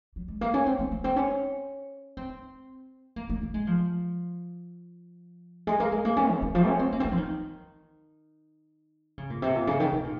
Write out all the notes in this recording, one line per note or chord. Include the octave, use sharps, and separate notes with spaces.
F#3
G#3
A#3
C#4
C4
A#3
A#3
C4
C#4
C4
A#3
A#3
A#3
G#3
F3
G#3
A#3
G#3
A#3
C#4
D#3
D#3
F3
C#4
C4
A#3
C4
A#3
F3
D#3
C#3
A#2
C3
A#2
C#3
D#3
C3
A#2